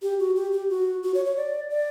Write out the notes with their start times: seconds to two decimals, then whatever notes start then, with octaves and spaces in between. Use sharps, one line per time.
0.02 G4
0.19 F#4
0.35 G4
0.52 G4
0.70 F#4
1.04 F#4
1.15 C#5
1.25 C#5
1.37 D5
1.70 D5